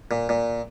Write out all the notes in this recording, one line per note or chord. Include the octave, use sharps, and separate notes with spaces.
A#2
A#2